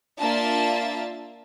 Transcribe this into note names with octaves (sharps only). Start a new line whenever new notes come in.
A#3 D4 F4 E5 A5 A6